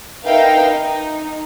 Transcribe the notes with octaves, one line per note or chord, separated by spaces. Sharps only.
D#4 A#4 B4 E5 F5 G5
D#4